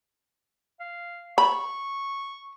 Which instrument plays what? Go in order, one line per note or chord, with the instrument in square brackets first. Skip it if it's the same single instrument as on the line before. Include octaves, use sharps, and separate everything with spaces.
[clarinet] F5
[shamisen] B5 [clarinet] C#6